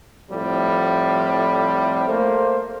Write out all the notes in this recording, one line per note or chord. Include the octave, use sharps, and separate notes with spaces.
F2 A2 F3 G3
A3 A#3 C5